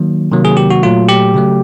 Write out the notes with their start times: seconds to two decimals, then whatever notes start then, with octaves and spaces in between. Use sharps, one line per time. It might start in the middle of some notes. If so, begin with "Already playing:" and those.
Already playing: D#3 F#3 A#3
0.32 C3 D#3 F#3 A#3
0.45 G#4
0.57 G4
0.70 F#4
0.83 A#2 F#3 A3 F4
1.08 G4
1.34 C#3 F#3 A3